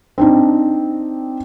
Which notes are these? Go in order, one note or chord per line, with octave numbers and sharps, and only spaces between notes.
C4 D4 D#4